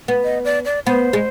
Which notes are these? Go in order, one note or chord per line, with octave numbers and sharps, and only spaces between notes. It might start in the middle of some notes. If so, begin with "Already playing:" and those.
B3
D#5
D5
D5
B3 C5
G#3